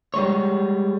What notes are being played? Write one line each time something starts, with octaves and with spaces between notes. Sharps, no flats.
G3 G#3 C#5